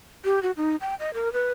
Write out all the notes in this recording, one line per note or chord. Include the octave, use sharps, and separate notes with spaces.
G4
F#4
D#4
G5
D#5
A#4
B4